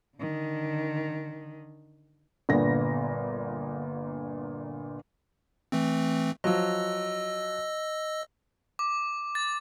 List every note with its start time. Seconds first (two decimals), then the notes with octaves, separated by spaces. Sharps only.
0.18 D3 D#3
2.49 G1 A#2 D3 B3 A#6
5.72 E3 A3 C4
6.44 F3 F#3 D#5 E6
8.79 D6
9.35 A6